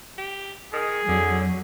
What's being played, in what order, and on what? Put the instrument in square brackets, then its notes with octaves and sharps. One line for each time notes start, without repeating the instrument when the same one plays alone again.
[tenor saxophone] G4
[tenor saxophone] D#3 [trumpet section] G#4
[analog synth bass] F2 [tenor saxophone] D3 [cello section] F#3